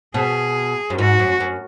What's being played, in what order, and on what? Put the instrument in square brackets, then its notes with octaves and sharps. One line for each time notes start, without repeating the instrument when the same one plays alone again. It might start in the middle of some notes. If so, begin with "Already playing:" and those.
[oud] B2 [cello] G#4
[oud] F#2
[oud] G#2 [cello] F#4
[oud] F#2
F#2